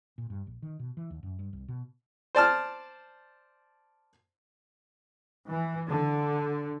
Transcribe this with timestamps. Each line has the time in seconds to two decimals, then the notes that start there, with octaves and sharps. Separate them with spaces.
0.18 A#2
0.30 G2
0.47 A#1
0.62 D#3
0.79 B2
0.97 E3
1.10 D#2
1.23 F#2
1.39 G2
1.53 C2
1.68 B2
2.35 C5 D5 A5 F6
5.49 E3
5.89 D3